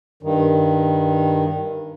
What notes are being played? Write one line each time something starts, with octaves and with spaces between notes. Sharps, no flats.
G2 D#3